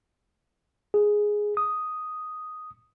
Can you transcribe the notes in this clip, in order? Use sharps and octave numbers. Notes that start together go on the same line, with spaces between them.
G#4
D#6